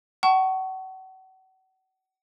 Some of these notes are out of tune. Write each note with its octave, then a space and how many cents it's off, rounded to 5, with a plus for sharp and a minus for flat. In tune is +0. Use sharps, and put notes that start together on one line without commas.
F#5 +35 A5 +0 C#6 +0